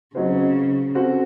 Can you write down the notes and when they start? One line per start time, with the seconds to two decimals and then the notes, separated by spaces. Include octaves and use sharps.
0.15 C#3 F#3 C4 D#4 F#4 C5
0.95 C4 F#4 A4 C5